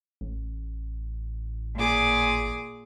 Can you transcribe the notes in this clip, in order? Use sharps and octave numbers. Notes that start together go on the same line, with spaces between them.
A1
A#2 G#4 D6